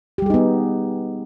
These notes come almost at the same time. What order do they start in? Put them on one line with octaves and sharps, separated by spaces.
G4 G3 G#4 D#4 B3